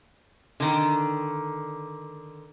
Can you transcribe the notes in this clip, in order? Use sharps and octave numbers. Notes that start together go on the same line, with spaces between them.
D3 D#3